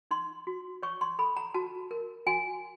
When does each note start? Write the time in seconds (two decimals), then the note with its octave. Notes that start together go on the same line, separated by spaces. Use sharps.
0.11 D#4 C6
0.47 F#4
0.83 C#5 C#6
1.01 C6
1.19 A4 B5
1.37 A#5
1.54 F#4 A5
1.91 A#4
2.27 F#4 G#5